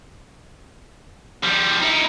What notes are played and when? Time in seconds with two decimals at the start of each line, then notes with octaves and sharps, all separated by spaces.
1.44 F3 G3
1.81 D#4 E4